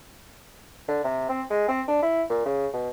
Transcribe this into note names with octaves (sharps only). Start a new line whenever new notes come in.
D3
C3
C4
G#3
C4
D4
E4
A#2
C#3
B2